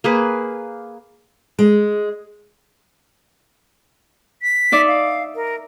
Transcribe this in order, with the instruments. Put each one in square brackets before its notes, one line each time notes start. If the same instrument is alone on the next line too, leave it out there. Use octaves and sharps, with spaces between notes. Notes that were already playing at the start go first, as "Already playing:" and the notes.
[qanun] A#3 G#4 B4
[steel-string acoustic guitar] G#3
[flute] B6
[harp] D#4 D5 E5
[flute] F5
A#4